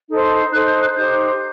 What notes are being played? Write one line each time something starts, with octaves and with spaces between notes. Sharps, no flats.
D#4 A4 C5
D#4 A4 C5 F#6
G6
F#6
D#4 G4 C5 G6